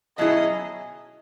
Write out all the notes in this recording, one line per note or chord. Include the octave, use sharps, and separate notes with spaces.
B2 F#3 C#4 E4 G#4 D#5